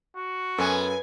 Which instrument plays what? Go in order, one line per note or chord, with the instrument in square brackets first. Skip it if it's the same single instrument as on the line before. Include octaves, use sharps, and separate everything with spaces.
[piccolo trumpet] F#4
[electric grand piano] F#2 A4 [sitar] B3 [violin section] G#5